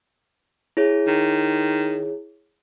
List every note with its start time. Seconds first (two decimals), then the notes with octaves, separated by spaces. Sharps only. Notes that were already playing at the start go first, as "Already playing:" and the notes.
0.77 E4 G#4 C#5
1.07 D#3